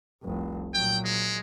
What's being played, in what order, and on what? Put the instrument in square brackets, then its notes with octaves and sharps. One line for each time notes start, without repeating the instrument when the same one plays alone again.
[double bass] F1 C2
[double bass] A#2 F#3 [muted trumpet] G5
[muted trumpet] G#3